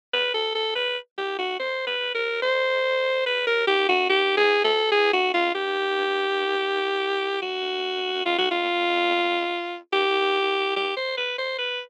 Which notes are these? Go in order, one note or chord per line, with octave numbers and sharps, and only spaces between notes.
B4
A4
A4
B4
G4
F#4
C5
B4
A#4
C5
B4
A#4
G4
F#4
G4
G#4
A4
G#4
F#4
F4
G4
F#4
F4
F#4
F4
G4
G4
C5
B4
C5
B4